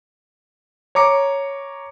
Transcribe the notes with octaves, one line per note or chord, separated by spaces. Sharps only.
C#5 A#5 D6 C#7